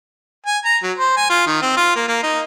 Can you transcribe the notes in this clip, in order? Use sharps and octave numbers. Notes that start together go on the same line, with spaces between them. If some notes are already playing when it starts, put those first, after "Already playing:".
G#5
A#5
F#3
C5
G#5
F4
D#3
C4
F4
A#3
A#3
D#4